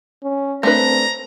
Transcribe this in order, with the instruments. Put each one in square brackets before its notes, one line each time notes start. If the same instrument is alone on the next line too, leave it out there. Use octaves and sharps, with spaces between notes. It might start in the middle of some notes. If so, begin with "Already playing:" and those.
[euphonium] C#4
[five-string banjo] A3 D4 B4 [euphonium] C4 [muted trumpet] A#5